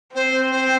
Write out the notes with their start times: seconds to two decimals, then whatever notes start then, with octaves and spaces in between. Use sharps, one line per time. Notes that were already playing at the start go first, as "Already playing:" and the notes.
0.15 C4 C5
0.51 C5